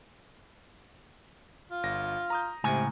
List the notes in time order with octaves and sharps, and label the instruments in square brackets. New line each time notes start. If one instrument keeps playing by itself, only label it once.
[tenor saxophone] F4
[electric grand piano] G1 A#6
A#5 D#6 G6
[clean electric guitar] C#2 A2 G#5 [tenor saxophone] C3